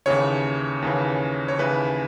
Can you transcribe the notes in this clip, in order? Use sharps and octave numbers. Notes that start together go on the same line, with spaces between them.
D#2 C#3 E3 C#5
D#2 C#3 E3
C#5
D#2 C#3 E3 B4